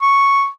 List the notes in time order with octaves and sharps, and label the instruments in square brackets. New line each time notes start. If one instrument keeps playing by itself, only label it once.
[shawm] C#6